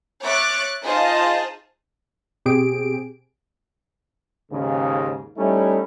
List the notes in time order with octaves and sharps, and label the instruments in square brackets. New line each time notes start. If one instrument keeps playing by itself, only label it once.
[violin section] C#5 E5 C#6 D6 F#6 A6
D#4 F4 G#4 C5 D#5 A5
[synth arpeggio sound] B2 C4 G4 G#4 D7
[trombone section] D#2 G#2 C#3
G3 A3 C#4 D#4 E4